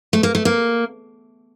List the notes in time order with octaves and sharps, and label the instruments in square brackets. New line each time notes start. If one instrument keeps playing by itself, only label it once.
[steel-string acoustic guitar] A3
A#3
A3
A#3